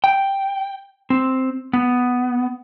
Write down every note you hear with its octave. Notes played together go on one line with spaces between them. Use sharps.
G5
C4
B3